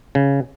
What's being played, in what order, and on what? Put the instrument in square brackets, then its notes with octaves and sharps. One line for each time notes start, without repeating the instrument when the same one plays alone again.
[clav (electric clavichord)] C#3